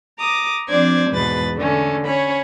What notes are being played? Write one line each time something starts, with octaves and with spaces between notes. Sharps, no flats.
A#5 D6 D#6
F3 C4 D4 C5 D5 G#6
E2 G#2 B2 B4 B5 A6
D3 A3 C#4
C#4 C#5 B5